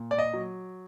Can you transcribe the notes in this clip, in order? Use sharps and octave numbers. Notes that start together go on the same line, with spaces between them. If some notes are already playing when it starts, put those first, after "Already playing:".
Already playing: A#2
D5
D#5
F#3